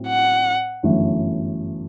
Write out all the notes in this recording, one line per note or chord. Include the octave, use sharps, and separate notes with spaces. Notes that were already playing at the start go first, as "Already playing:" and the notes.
Already playing: A2 F#3 C4
F#5
G1 F#2 E3 A3